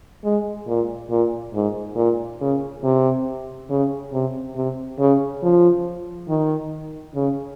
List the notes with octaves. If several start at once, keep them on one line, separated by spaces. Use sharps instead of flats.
G#3
A#2
A#2
G#2
A#2
C#3
C3
C#3
C3
C3
C#3
F3
D#3
C#3